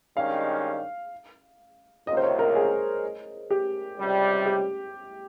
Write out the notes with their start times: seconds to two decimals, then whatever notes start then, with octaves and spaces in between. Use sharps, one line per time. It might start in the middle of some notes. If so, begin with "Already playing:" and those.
0.16 G2 D#3 G#3 C#4 G4 F5
2.07 C#2 C3 D#3 A#3 F4 D#5
2.17 C5
2.24 C#5
2.39 A#4
2.55 G#4
3.50 G4
3.98 C#2 C3 G3
4.46 G4